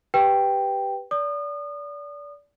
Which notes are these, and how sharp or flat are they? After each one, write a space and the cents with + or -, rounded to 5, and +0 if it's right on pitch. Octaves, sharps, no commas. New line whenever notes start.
G4 +0 B4 +0 G5 +0
D5 -25 D#6 -35